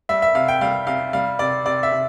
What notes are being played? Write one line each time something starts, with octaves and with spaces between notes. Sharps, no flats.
G3 E5
E5
C3 F5
G5
G3 F5
C3 F5
G3 F5
C3 D5
C3 D5
E5
C3